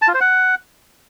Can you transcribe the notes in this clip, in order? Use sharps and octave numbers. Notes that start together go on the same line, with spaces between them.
A5
F4
C5
F#5